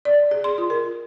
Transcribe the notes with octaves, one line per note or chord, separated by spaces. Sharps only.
D5
G#4
C6
F4
A#4